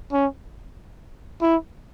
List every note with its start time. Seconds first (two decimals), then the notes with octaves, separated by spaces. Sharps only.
0.13 C#4
1.42 E4